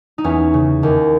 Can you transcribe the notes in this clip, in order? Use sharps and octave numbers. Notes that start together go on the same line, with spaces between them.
D#4
E2 C#4
C#3
D#2